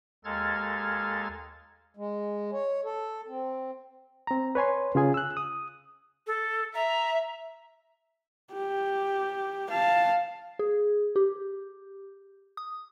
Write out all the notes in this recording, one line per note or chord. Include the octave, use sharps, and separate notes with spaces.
D#2 G#3 A4 F6 G#6 A6
G#3
C#5
A4
C4
C4 A#5
B4 C#5 G#5 C6
C#3 F4 G#4 G#5
E6 F#6
D#6
A4
E5 A#5
G4
F5 A5
G#4
G4
D#6